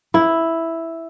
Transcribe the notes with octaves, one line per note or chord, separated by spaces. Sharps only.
E4